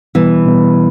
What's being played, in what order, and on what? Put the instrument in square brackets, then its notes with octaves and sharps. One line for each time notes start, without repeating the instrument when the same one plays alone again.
[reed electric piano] B2 G3 B3 [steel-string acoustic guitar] E3
[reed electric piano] B2 G3 B3